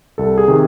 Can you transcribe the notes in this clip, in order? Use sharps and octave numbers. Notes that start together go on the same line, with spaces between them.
C2 A4
G#4
C3 D#3